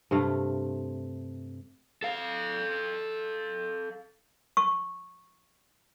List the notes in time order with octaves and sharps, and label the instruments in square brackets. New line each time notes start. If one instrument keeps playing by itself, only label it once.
[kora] G2 C3 A3 F5
[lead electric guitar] A4 F5
[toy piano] C#6